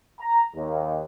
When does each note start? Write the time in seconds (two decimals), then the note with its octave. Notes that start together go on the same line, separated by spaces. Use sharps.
0.19 A#5
0.54 D#2